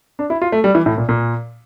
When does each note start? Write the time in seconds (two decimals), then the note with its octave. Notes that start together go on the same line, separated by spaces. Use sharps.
0.19 D4
0.30 E4
0.42 F4
0.52 A3
0.64 G3
0.75 E3
0.86 A2
0.98 A#2
1.09 A#2